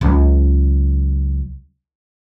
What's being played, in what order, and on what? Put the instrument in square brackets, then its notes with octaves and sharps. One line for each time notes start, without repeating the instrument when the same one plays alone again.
[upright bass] C#2 F#3